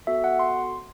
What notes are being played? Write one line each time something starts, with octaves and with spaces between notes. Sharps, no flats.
B3 F#4 A4 E5
F#5
C6